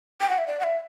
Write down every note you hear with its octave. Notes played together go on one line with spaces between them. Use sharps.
G5
F#5
E5
D5
F#5
E5